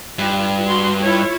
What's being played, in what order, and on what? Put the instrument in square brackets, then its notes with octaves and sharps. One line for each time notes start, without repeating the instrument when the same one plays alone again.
[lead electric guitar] G2 [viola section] F4
[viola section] F#4 C6
E4 F4 C#5